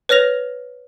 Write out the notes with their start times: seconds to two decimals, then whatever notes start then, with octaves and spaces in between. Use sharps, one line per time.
0.09 B4 C#5 F6 A#6 F7